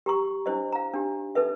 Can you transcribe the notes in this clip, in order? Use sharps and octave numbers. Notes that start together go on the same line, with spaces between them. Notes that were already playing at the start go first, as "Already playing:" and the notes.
G4 A#5 C#6
D4 E4 C5 D#5
F5 A#5
D4 D#4 G4
D#4 A4 B4 E5